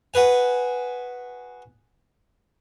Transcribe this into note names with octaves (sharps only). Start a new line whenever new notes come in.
F#4 G#4 B4 G#5